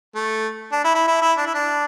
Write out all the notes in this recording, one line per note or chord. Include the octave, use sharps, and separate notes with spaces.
A3
D4
E4
E4
E4
E4
D4
E4
D4